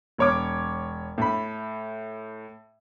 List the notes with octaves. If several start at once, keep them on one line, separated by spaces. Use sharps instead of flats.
E1 C#5 D6
A2 B5